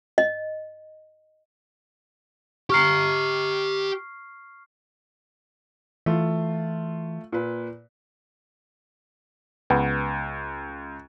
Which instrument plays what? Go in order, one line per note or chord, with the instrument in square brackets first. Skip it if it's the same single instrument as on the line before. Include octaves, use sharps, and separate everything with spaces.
[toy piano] D#5
[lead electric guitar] G4 A#5 [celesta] C#6 F6 C7
[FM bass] E3 [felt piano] A3 F4
[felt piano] A#2 B4
[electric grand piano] C#2 [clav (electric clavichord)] B3